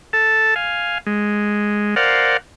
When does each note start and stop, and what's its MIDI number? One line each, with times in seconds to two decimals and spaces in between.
0.13 0.54 69
0.13 0.54 81
0.56 0.98 77
0.56 0.98 80
1.07 1.95 56
1.96 2.37 70
1.96 2.37 72
1.96 2.37 74
1.96 2.37 77
1.96 2.37 78